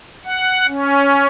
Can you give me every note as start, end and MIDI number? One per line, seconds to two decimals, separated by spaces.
0.25 0.67 78
0.68 1.27 61